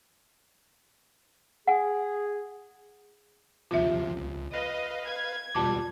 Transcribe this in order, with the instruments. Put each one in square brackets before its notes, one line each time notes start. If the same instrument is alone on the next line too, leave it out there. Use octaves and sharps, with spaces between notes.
[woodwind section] G#4 [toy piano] F#5 G#5
[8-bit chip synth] D#2 C3 F3 [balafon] F4 E5
[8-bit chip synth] C#2
[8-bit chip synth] B4 F5 [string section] D#5
[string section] G#6
[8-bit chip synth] E2 B2 G3 [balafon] F4 A5 D6